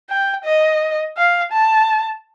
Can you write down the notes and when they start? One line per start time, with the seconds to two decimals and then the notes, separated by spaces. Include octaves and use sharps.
0.09 G5
0.45 D#5
1.17 F5
1.52 A5